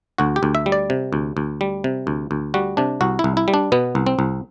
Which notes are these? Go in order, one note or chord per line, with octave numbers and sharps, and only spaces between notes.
D2 F#4
G4
D2
E5
G3
D5
C3
D2
D2
G3
C3
D2
D2
G3 F#4
C3 D4
C2 F#4
E4
C2
E4
G3
D4
B2 B3
C2
C4
C2